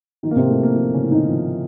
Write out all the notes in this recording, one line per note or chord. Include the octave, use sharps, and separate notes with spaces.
D#3 F3 D#4
A#3
C3 C4
A2 A3
A#3
F3
C#3 C#4
A2
D#3 D#4
F3